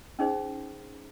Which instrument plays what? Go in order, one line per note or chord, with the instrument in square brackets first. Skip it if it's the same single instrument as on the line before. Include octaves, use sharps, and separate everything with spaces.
[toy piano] C#4 D#4 G#4 C5